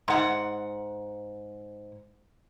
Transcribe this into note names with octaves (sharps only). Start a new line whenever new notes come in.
G#2 F#5